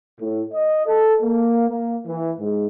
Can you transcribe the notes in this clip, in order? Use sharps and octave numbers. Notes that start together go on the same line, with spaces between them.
A2
D#5
A4
A#3
A#3
E3
G#2